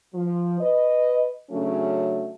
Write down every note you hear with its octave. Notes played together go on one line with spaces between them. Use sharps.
F3
B4 D#5
C#3 F#3 A3 C#4 D4 F#4